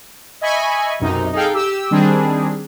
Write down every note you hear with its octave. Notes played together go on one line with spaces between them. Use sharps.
D#5 E5 G#5 B5 C#6
B1 F#2 C3 D#4
D#4 G#4 A4 F5 G5
G4 E6
D#3 G3 C4 D4 G#4